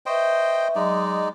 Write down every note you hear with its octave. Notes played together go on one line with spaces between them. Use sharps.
B4 C5 D#5 E5 G5 C#6
F#3 G#3 D#4 D5 C6